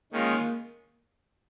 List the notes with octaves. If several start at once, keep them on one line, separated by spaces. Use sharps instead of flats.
D#3 G#3 A#3 C#4 F4